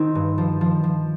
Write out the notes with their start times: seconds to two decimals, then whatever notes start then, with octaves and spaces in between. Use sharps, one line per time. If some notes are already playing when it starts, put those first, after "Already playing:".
Already playing: D#3 C4 D#4
0.15 G2
0.38 F3
0.61 F3
0.84 F3